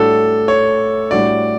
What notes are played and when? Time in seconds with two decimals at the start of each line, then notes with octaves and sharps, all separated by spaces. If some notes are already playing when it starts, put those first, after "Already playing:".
Already playing: A2 G3 D4 F#4 A4
0.48 C#5
1.11 A2 G3 D4 F#4 D5